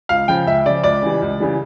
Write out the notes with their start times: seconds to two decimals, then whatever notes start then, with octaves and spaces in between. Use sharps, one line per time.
0.09 C#2 F5
0.28 C#3 F3 G5
0.47 C#2 E5
0.66 C#3 F3 D5
0.83 C#2 D5
1.02 C#3 E3 G3
1.22 C#2
1.40 C#3 E3 G3